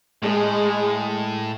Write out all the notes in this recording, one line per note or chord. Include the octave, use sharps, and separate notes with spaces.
A2 G#3